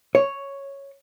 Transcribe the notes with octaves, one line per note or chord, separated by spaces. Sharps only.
C#5